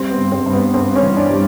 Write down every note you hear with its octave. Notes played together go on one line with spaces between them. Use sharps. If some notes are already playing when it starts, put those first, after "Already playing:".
Already playing: G3 C4
B3
G2
C4
G2
B3
G2 C4
C#4
E3
D4
G3